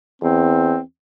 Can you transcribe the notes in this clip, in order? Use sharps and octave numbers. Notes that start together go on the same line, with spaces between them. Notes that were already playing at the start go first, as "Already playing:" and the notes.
E2 C4